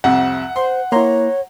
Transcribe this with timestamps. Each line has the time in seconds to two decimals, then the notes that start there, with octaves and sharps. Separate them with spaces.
0.04 C2 F2 C3 F#5
0.56 C5 C6
0.92 A#3 E4 C#5 A#5 C6